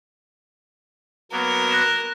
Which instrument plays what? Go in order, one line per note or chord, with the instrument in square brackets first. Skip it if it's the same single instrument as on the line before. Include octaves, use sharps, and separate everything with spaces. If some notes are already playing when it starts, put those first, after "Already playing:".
[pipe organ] F#3 A#3 B3 [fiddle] A#4
[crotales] F#6 A#6 E7